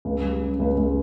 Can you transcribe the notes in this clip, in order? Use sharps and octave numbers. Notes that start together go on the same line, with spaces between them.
C#2
G3
C#3
C#2
C#2